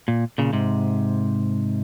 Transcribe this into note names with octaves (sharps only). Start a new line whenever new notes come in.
A#2
A#2 C#3
G#2 C3